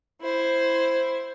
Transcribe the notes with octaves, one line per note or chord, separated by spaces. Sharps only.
E4 C5